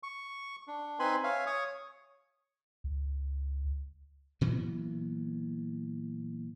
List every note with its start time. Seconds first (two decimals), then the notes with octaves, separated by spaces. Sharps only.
0.03 C#6
0.68 D4
0.99 C4 D#4 B4 G#5 B5 C6
1.23 C#5 E5 F5 G#5
1.47 C#5 C#6 D#6
2.84 C#2
4.41 A#2 E3 F#3 B3